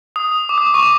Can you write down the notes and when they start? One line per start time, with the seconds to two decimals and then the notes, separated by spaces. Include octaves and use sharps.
0.16 D#6
0.49 D6
0.58 D#6
0.74 C#6
0.83 D6